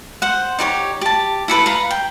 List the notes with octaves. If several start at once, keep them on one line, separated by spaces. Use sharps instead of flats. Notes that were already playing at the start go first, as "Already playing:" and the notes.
C5 F#5
D#4 G4 B4 C#5
G4 A5
E4 A4 B4 B5
B4 F5 A#5
G5